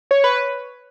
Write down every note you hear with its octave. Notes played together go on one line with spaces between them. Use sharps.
C#5
B4